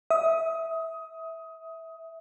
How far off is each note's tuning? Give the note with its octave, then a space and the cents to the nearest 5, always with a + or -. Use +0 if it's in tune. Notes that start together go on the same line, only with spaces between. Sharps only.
E5 -15 D#6 +20